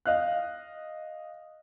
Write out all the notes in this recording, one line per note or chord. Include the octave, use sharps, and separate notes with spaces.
D#5 F5 F#6